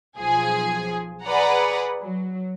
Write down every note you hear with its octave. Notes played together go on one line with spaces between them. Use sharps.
B1 F3 G#4 G#5
G#4 B4 D5 F#5 A#5
F#3